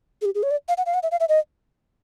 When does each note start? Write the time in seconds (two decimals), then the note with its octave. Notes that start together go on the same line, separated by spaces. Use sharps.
0.22 G#4
0.25 G4
0.35 G#4
0.43 C#5
0.51 D5
0.68 F5
0.78 F#5
0.86 F5
0.94 F#5
1.03 E5
1.11 F5
1.20 E5
1.29 D#5